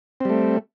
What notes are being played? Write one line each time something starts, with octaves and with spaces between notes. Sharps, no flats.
G3 A3 C4